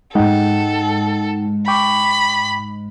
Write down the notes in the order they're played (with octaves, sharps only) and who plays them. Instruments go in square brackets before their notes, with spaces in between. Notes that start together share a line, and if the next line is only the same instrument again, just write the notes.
[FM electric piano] G#2 G#3 [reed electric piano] D#4 F#5 G5 [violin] A4
[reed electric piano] G5 C#6 D6 [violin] B5